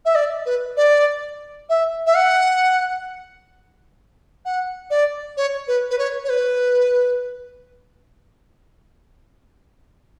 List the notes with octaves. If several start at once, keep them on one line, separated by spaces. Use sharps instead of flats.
E5
D5
B4
D5
E5
E5
F#5
F#5
D5
C#5
B4
B4
C#5
C#5
B4